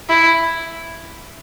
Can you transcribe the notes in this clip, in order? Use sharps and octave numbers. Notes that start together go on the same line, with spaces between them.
E4